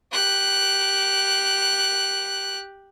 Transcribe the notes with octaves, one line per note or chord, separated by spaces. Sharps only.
G4 F#6